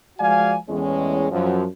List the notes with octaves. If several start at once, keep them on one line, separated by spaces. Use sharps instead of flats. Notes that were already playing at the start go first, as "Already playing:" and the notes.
F3 G#3 F#4 D5 F5 G#5
E2 A2 G#3 C#4
F#2 F3